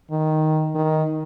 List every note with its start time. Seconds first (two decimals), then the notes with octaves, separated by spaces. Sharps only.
0.11 D#3
0.75 D#3